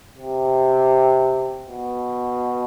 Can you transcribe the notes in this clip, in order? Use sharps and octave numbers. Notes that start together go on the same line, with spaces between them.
C3
B2